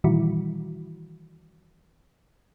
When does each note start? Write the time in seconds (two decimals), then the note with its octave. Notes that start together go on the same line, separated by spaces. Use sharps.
0.04 A#2 D#3 E3 G3 E4 F#4